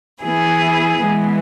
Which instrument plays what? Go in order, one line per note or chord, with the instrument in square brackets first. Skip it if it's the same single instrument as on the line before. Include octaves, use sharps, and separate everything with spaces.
[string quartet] E3 B3 E4 G#4
E3 G#3 B3